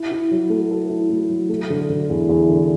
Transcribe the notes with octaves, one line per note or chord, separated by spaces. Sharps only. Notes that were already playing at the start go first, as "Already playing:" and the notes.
Already playing: E4
E4
F#3
A3
A4
E4
A3
F#3
A3
D3
D3
E2
E2
D3